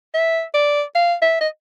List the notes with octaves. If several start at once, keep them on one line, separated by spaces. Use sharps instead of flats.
E5
D5
F5
E5
D#5